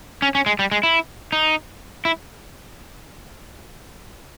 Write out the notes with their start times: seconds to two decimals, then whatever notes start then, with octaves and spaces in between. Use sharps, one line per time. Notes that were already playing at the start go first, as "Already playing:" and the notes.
0.22 C#4
0.35 C#4
0.46 G#3
0.59 G3
0.72 G#3
0.83 E4
1.32 D#4
2.05 E4